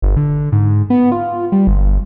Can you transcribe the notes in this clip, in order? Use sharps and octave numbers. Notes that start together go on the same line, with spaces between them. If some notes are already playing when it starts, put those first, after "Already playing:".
G1
D3
G#2
B3
F4
G3
G1